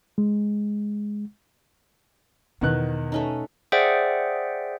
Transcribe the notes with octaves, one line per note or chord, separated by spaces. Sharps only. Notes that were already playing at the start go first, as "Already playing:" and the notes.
G#3
E2 B2 D3 D#3 F#6
A3 C#4 D#4
G#4 C5 D5 E5 F#5 G5